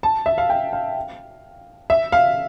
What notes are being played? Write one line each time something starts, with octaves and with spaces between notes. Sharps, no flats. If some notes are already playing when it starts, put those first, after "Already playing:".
A5
E5
F5
G5
F5
E5
F5